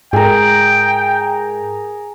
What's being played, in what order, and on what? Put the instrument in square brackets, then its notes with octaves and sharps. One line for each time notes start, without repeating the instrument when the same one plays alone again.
[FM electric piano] G#2 [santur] G#4 A#4 [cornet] G5